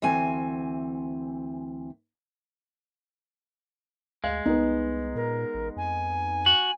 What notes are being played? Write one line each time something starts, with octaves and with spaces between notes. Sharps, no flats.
D2 E3 C4 G#5
D2 G#3 F5
C2 B3 D#4
A#2 A#4
A1
F2 G#5
F#4